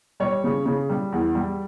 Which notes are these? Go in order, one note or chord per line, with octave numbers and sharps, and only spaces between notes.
G3 C#5
C#3
C#3
G3
E2
G3